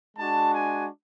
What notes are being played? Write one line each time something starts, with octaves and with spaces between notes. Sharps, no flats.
G#3 D4 F#4 A5
G#5